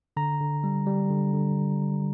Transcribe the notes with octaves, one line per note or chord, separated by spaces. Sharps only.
D3 A#5
D3
G3
G3
D3
D3